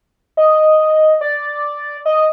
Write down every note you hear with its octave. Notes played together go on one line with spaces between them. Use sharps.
D#5
D5
D#5